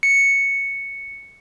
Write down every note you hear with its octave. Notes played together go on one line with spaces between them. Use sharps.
C#7